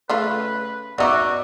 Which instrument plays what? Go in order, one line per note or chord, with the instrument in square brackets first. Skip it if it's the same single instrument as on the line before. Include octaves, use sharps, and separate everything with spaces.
[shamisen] C#3 A3 F4 [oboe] B4
[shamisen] B3 D#4 [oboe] F#4 [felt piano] D5 E5 D6